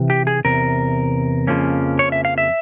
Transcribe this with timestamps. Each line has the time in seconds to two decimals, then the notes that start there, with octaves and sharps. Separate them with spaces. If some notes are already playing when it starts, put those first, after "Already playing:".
Already playing: C3 E3
0.10 G4
0.27 G#4
0.45 E2 C3 A#4
1.47 F2 C#3 F3 A#3 C#4
1.99 C#5
2.12 E5
2.25 F5
2.38 E5